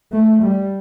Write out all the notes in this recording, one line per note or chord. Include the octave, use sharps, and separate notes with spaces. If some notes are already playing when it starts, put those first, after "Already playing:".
A3
G3